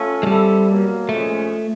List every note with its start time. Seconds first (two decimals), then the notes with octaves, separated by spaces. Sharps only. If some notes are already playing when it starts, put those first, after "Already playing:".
Already playing: A3 C#4 F4 A4
0.23 G#3
0.27 G3 C4 E4 A4
0.68 B2 F#3 A#3
1.09 A#2 F3 G#3 A3 C#4